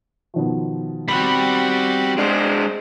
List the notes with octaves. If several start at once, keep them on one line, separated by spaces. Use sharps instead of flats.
B2 D#3 F3
G3 C4 F#4 B5
G#3 D4 G#4 C5